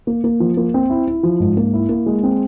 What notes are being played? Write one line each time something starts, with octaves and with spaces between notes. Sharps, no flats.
A#3
A#3
F3
A#3
C4
E4
E4
F3
G#2
A#3
E4
A#3
G#3
C4